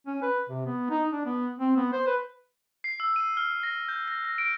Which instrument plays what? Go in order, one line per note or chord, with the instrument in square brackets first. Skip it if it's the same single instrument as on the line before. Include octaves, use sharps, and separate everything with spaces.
[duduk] C#4
B4
C3
B3
D#4
D4
B3
C4
B3
C5
B4
[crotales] C7
E6
D#7
F6
A#6
G6
A#6
A#6
D7